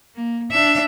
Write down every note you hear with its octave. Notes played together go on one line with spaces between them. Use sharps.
A#3
D4 E5